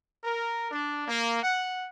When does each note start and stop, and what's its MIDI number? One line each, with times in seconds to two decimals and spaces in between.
0.24 0.70 70
0.71 1.04 62
1.08 1.40 58
1.43 1.88 78